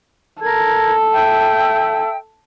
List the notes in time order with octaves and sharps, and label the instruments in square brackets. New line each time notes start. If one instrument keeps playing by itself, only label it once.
[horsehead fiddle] A4 [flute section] A#4 G#6
[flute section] E5 G5 E6